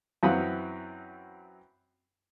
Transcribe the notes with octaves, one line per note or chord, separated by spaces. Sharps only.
F#2 E3 C4 F#5 B5 D#6